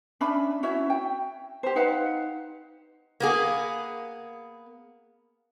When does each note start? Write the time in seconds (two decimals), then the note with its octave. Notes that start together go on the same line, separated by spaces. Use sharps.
0.21 C#4 D4 E5 B5
0.63 C#4 E4 F#4 E5
0.90 G5
1.63 G4 C5
1.76 D#4 B4 F5 F#5
3.20 A#3 B3 G#4